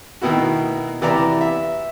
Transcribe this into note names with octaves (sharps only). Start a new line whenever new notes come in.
B2 D#3 B3 E4 F#4
C3 E3 B3 D5 E5 A#5
E5